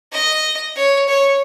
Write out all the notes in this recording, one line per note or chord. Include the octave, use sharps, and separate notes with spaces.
D#5
C#5
C#5